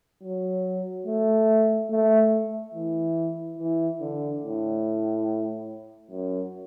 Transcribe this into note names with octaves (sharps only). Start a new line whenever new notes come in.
F#3
A3
A3
E3
E3
D3
A2
F#2